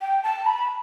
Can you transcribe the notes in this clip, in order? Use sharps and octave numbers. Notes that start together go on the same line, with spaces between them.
G5
A5
B5